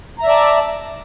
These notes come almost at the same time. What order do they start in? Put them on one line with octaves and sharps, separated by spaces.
A#5 E5 D5 A5